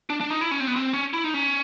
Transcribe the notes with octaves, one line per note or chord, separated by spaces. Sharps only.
D4
D4
D#4
E4
C#4
C4
B3
C4
C#4
E4
D#4
C#4